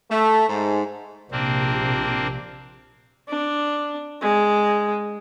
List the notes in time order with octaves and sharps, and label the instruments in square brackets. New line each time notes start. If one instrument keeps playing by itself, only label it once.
[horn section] A3
G#2
[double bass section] A#1 C3 [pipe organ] A#3 C4 D4
[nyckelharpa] D4
G#3